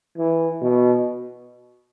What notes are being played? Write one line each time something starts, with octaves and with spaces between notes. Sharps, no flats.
E3
B2